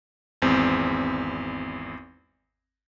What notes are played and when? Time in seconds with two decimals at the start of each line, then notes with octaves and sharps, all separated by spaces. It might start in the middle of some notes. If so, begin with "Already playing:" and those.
0.42 G#1 E2 C4